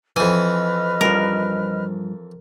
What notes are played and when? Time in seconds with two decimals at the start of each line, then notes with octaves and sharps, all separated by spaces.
0.16 F2 E3 B4 D#5 G#5 F6
1.01 G2 F3 A#4